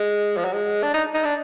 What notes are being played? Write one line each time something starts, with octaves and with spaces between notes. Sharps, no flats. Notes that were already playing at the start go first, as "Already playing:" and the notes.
Already playing: G#3
F3
F#3
G#3
D4
D#4
D#4
D4